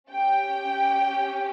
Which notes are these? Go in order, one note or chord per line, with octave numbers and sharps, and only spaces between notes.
C#4 G4 G5